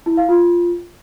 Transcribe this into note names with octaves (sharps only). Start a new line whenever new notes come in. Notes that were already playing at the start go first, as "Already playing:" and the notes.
E4
F5
F4